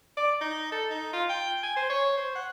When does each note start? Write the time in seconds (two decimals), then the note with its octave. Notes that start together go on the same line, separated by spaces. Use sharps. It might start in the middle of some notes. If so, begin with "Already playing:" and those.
0.17 D5
0.41 D#4
0.72 A4
0.90 D#4
1.13 F4
1.29 G5
1.63 G#5
1.77 C5
1.90 C#5
2.17 C5
2.35 F#5